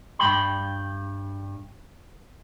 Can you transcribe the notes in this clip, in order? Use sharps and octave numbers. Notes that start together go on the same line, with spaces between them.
G2 G5 B5